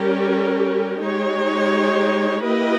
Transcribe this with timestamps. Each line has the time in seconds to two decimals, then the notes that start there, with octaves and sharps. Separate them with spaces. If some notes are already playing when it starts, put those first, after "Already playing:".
Already playing: G3 C#4 G4 A#4
1.01 G#3 D#4 G4 C#5
2.43 A#3 E4 G4 B4 D#5